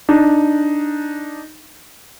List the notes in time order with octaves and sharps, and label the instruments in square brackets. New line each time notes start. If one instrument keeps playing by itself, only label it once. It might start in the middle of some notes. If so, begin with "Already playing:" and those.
[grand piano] D4 D#4